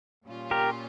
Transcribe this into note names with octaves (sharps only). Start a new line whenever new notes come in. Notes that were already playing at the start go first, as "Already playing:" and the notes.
A#2 G3 C#4 F4
G4 A#4